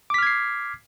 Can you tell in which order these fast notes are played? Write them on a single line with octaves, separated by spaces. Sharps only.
D6 B6 F6 G#6 C7